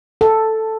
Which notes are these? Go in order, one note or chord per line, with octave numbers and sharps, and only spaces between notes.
A4